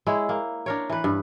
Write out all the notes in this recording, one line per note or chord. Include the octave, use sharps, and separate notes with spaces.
G#3 E4 C#5
A#3
D4 A#4 C#5
E3 B4
G2